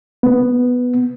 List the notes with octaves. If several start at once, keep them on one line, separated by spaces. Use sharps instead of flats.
B3